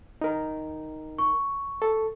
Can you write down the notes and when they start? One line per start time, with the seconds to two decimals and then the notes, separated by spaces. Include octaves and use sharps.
0.21 D#4 A#4
1.18 C#6
1.82 A4